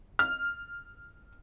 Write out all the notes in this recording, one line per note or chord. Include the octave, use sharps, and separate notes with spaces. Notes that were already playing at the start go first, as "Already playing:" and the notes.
F6